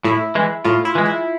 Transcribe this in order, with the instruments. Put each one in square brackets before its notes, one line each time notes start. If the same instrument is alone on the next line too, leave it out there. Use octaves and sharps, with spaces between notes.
[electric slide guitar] A2 [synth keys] E4
[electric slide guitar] E3 G#3
[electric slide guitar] A2 [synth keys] F4
[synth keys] E4
[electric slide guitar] E3 G#3
[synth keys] E4